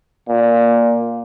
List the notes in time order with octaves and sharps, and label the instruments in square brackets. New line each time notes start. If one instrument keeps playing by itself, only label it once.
[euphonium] A#2